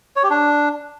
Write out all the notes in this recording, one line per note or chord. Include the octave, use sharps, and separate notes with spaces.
C#5
G4
D4